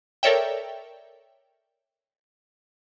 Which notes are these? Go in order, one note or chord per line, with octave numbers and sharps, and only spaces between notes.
A4 A#4 C#5 D5 E5 G5